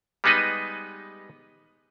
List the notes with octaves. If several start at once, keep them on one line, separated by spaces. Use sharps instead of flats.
G3 G#3 B3 D#4 B4 D#5